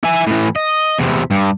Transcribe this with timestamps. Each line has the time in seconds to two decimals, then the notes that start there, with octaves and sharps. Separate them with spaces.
0.04 E4 G#5
0.27 A2 E3
0.56 D#5
0.98 E2 C3
1.31 G2